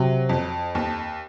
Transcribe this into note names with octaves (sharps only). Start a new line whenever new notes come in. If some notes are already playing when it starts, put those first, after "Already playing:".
Already playing: C3 F#3
F2
D#2